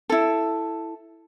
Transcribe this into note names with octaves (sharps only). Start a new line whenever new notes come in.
E4 A4